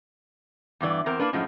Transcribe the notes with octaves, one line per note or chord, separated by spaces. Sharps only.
E2 G2 E3 D5
E2 C4 A#4
A#3 D4 B4
F#2 A2 F3 G#3